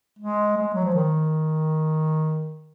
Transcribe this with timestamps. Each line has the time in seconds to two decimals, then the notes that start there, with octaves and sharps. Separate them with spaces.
0.19 G#3
0.57 G#3
0.75 F#3
0.85 F3
0.94 D#3